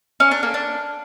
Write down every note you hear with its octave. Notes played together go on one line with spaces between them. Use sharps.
C#4
D4
A#3
D4